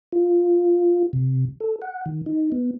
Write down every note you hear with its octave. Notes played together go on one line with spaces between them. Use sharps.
F4
C3
A4
F#5
D#3
D#4
B3